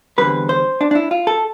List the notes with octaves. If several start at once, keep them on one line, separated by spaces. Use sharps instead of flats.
E2 D3 G3 C4 B4
C5
D4
D4
E4
F4
A4